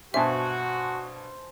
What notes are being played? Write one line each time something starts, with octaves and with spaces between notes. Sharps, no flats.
G2 B2 F#4 C5 E5 G#5 A5